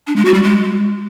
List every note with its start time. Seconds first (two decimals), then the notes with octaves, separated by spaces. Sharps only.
0.07 D4
0.16 G#3
0.25 F#4
0.34 G3
0.43 G#3